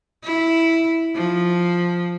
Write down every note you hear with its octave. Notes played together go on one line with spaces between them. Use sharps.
E4
F3